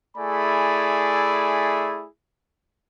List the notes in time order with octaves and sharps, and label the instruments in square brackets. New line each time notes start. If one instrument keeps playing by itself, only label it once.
[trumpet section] A3 E4 G#4 D5 G#5 B5